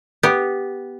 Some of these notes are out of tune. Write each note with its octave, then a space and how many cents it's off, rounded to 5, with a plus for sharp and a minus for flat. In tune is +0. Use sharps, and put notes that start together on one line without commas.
B3 +0 G4 +0